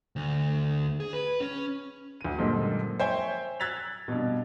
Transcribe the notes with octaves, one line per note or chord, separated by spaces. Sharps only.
D2
G#4
B4
C#4
D2 D#7
F#2 A#2 D3 F3 G3 G#3
C5 C#5 E5 G5 G#5
E6 F#6 G#6 A6 B6 F7
G2 B2